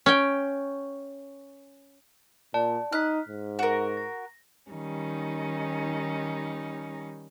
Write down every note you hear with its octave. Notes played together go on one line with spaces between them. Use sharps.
C#4 G5
A#2 D5 A5
D#4 F6 F#6 B6
G#2
F#4 A#4
A#6
D#3 G3 C#4 D#4